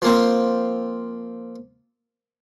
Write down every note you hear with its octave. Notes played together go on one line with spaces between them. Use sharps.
F3 A#3 C4